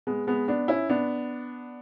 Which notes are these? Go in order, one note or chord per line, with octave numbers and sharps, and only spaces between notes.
G#3 B3
G#3 B3
B3 D4
C#4 E4
B3 D4